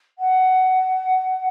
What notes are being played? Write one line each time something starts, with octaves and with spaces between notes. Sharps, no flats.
F#5